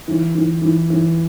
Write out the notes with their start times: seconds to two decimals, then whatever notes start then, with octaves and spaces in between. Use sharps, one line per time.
0.08 E3
0.35 E3
0.62 E3
0.90 E3